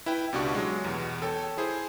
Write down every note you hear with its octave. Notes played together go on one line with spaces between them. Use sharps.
E4 B4 G5
C#2 B2 D4 F#4 G4 C#6
F#3 G#3
E2 B2
A4 C#5 G5 A5
E4 G#4 C5